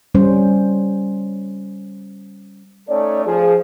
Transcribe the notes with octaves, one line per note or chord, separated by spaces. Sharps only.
G3 C#4 C5
A3 C#4 D#4 A4 C#5 D5
F3 G#4